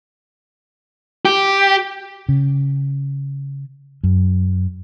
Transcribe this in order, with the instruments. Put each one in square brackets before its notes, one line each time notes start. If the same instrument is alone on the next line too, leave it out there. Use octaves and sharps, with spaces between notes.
[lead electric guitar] G4
[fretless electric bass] C#3
F#2